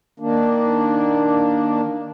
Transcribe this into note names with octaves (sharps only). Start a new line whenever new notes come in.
D#3 A#3 D4